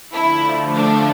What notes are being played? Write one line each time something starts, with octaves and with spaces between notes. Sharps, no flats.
D3 F3 A3 E4
D4